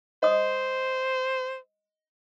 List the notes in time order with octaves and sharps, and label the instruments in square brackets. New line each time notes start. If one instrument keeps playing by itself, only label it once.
[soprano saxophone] C5 [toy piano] D#5 D#6